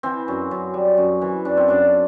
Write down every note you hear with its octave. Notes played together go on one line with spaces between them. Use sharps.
E3 C4
F#2
F#2
G3
F#2
E3
F#2 D4
C4
F#2 D4